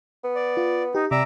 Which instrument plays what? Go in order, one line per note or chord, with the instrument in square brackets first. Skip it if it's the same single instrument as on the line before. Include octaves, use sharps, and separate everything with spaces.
[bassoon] B3
[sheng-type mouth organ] D5
[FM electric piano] F4
[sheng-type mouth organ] D#4 [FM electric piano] G4
[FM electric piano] C3 [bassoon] G3 [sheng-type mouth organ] E5 A#5 D6